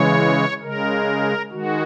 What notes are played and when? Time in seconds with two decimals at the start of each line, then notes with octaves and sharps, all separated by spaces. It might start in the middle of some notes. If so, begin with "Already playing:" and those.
Already playing: C#3 E3 G#3 C#5
0.62 C#3 G#3 A#4
1.51 D#3 G#3 F#4